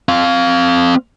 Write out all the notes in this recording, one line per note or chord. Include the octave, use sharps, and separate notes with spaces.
C4 F5